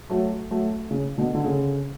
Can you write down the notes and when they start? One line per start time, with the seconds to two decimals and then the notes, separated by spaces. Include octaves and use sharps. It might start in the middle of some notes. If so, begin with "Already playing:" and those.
0.10 F#3 A3
0.51 F#3 A3
0.91 C#3
1.18 B2 D3
1.35 D3
1.44 C#3